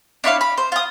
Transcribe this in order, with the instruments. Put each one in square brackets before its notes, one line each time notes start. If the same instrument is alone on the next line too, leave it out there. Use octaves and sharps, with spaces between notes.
[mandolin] D4 E4 C#5 F5
B5
C5
F4 D#6